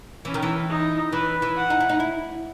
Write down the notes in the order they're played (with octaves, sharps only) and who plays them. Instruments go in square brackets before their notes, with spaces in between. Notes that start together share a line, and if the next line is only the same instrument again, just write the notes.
[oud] E3 [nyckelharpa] C#4
[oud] D#3
E3
[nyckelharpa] D#4
[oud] E3 [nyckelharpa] B4
[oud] E3
[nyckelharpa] F#5
[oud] D#4
E4
D#4
E4